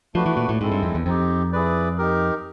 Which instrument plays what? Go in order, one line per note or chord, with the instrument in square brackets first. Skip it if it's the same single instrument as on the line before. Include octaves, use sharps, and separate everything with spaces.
[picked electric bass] F3 [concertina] A3 D4 F#4 B4
[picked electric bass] E3
A#2
A2
[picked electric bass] G#2 [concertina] G#3 C4 E4 A4
[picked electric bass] G2
F2
E2
[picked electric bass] F2 [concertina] C4 D#4 G4
[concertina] E4 G#4 B4 D5
D#4 G4 A#4